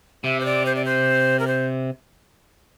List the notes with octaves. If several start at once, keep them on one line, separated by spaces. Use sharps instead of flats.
C3 E5
C5
D5
C5
D5
C5
A#4
C5